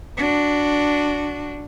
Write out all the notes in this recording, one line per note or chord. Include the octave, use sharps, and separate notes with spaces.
D4 F#4